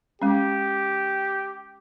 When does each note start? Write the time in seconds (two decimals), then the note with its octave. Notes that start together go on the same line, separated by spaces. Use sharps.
0.22 G#3 C#4 G4